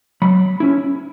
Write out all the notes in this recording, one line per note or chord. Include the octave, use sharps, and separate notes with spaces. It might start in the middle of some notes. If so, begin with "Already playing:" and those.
F#3 B5
C#4 E4